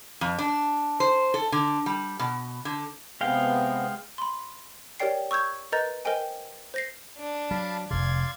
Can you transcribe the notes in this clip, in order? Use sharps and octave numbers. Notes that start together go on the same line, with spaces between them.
F2
D4
C5
A4
D3
G3
B2
D3
C3 G#3 B3 F5 G5
B5 C6
G4 A#4 C#5 D5 G5 C7
C#6 E6 G6 G#6
A#4 B4 D#5 A#5 G6 A6
A#4 C5 D#5 G5 G#5
C5 A#6 C7
D4
F#3 F5 A5 B5
F1 C3 D5 F5 C6 G#6